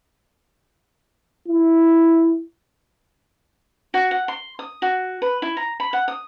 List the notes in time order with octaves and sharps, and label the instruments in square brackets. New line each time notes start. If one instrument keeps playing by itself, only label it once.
[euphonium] E4
[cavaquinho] F#4
F#5
C6
D#6
F#4
B4
E4
A#5
B5
F#5
D#6